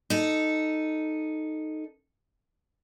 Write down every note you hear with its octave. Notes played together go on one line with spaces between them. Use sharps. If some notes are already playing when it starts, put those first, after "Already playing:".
D#4 A4